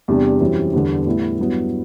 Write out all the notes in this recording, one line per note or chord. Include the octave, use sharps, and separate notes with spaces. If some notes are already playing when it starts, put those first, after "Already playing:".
E2 C3 G3 D4 G4
F#2 E3 G3 C4
E2 D3 G3 B3
A2 G3 B3 E4
G2 F#3 B3 E4